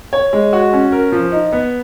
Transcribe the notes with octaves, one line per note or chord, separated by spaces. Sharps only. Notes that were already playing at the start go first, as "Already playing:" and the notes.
C#5
G#3
F#4
C#4
A#4
F3
D#4
B3